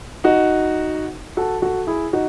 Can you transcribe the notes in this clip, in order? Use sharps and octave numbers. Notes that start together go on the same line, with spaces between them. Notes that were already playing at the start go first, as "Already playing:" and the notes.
D#4 F#4
F#4 A4
F#4 A4
E4 G#4
D#4 F#4